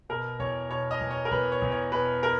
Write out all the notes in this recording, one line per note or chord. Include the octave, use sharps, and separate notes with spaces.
B2 A#4
E2 C#5
B2 C#5
D#5
E2
C#5
A#4
E2 B4
C#5
E2
C#5
B2 B4
A#4